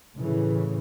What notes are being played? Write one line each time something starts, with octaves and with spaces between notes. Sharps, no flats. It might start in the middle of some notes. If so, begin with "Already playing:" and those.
A2 C#3 E3